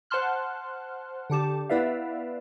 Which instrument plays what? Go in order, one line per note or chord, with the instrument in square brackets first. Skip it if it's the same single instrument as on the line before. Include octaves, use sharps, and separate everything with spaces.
[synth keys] C5 F#5 A5 C6 F6 F#6
D3 D4 G4 A5
B3 E4 B4 D5 E5 F5